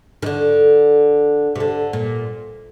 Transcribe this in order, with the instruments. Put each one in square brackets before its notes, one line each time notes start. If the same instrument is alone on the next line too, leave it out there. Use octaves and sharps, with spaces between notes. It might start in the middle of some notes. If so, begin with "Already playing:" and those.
[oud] D#3
D3
C3
D3
A#2